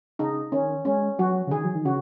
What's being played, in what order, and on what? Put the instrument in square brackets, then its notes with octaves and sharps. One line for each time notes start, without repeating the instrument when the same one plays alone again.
[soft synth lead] C#3 [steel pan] D#4
[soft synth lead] D#3 [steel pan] C#4
[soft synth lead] G#3 [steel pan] C#4
[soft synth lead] F#3 [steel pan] F#4
[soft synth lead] C#3
[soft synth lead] D#3 [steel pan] G#4
[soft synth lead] F#3
D#3
[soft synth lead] C#3 [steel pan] F#4